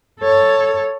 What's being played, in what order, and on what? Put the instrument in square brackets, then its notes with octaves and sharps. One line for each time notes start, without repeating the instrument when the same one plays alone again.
[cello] A4 C#5